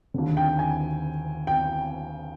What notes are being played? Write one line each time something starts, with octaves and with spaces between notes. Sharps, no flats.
D#2 D3
G5
G#5
G5